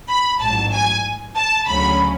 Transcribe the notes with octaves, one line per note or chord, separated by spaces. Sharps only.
B5
A1 G#2 F#3 A5
G#5
A5
D2 C#3 F#3 C#4 B5